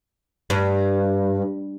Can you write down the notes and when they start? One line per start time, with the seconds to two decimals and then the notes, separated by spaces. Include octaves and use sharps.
0.50 G2